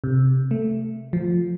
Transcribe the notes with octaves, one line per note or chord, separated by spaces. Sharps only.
C3
A3
F3